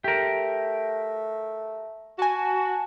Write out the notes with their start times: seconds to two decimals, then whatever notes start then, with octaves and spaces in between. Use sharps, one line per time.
0.04 A3 G4 A#4
2.19 F#4 G#5 A5